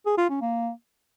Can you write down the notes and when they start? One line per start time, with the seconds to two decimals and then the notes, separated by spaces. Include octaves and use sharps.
0.06 G#4
0.18 F4
0.30 C#4
0.41 A#3